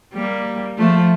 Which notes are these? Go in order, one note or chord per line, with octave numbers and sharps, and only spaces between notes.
G3 A#3
F3 A3